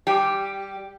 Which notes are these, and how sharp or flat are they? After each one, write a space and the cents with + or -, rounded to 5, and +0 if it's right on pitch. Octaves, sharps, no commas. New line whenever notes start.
G3 +0 G4 +0